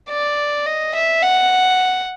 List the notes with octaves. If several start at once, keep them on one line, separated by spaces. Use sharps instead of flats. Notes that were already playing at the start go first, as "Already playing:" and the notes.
D5
D#5
E5
F#5